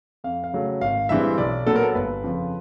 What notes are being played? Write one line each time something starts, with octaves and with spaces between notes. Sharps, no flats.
F2 F5
F5
C#3 F#3 A3
G#1 F5
G2 E3 G#3 C4 E5
B1 D5
A#2 F#3 B3 A4
A#4
A4
G1 B4
F2 C#3 F3